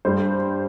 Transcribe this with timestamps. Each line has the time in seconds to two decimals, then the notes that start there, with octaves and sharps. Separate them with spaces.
0.05 G2 G3 C5